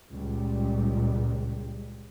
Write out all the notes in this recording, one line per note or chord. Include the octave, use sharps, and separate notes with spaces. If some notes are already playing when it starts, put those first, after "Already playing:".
C#2 A#2 G3